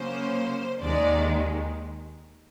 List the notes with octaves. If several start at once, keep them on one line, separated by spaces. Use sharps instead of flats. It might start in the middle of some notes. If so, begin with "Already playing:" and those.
Already playing: C#3 F#3 A#3 C#4 C5
D#2 D#3 G#3 D5